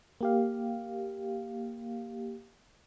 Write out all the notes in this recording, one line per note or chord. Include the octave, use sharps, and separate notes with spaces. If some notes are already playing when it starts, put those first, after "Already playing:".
A#3 G4 F5